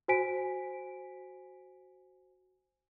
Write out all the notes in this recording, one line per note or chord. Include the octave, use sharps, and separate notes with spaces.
F#4 C5 G#5 B6 D7